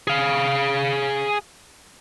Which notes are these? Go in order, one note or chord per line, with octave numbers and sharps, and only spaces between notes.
G#4 F5